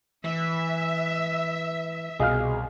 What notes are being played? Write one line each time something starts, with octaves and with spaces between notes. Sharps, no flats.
E3 E5
C2 B2 G#4 D#5 F5 F6